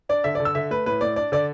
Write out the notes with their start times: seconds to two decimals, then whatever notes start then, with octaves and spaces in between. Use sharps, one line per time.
0.09 D4 D5
0.24 D3 E5
0.35 D5
0.40 D3
0.45 E6
0.55 D3 E5
0.71 A3 B4
0.86 A2 B4
1.01 A2 D5
1.16 D4 D5
1.32 D3 D5